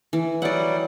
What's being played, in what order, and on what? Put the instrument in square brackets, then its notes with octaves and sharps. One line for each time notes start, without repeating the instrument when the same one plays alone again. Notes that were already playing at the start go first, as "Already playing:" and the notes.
[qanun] E3
[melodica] F#3 G3 [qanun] D5 F#5